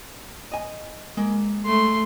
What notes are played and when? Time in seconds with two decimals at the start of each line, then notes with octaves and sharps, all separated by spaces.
0.52 D#5 G#5
1.17 G#3 A#3
1.65 A3 C6